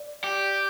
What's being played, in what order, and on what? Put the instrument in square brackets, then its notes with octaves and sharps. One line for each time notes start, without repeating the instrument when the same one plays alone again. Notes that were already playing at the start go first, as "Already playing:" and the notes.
Already playing: [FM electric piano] D5
[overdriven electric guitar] G4